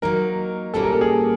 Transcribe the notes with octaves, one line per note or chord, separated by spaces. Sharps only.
F#3 A#3 D#4 A#4
A#2 G3 A#3 C#4 A4
A#4
A4
G#4